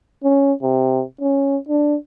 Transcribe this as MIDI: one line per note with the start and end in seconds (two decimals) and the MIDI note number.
0.24 0.53 61
0.62 1.03 48
1.21 1.57 61
1.69 1.96 62